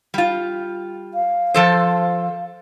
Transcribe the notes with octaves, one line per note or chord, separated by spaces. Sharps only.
G3 F4
F5
F3 A4 C5